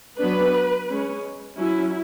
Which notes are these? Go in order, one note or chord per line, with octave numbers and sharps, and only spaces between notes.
F#3 B3 D4 B4
G#3 C#4
F#3 C#4 E4